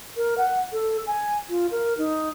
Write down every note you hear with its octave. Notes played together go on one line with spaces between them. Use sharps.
A#4
F#5
A4
G#5
F4
A#4
D#4